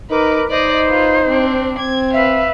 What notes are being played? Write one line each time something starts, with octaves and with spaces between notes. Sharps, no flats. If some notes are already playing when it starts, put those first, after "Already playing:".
D#4 A#4 B4 D6
D#4 C5 D5 D#5
F4 B4
C4 D4
C4 G#6
B4 E5 F5